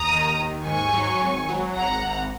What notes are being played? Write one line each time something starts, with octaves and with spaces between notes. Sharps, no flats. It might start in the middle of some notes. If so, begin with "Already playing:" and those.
Already playing: D#2 A#5 D#6
D#3
D#2
G#2 G#5 C#6
F#3
G#1
F#3
G#1 F#5 A#5
G#1